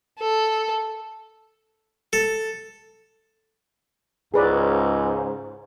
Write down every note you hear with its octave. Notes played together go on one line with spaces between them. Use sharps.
A4
A4
C#2 G#2 C#3 G#4 B4 D5